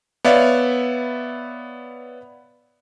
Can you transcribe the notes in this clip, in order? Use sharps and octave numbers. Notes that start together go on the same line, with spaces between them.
B3 C#5 D5 E5 F5